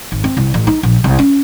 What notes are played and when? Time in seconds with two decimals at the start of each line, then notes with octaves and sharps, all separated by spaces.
0.12 G#1
0.24 C4
0.37 C2
0.54 A1
0.67 D#4
0.83 A#1
1.04 C2
1.19 C#4